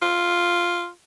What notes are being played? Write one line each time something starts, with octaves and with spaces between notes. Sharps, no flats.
F4